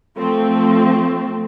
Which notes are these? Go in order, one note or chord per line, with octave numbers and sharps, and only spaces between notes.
F3 A3 C4